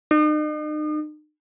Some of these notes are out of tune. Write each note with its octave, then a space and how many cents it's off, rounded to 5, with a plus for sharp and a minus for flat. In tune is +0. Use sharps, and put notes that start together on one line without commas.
D#4 -40